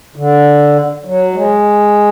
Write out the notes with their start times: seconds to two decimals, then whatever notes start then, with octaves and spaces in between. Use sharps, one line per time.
0.16 D3
1.05 F#3
1.33 G#3